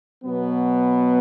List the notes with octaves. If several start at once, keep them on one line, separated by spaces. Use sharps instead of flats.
B2 F#3 B3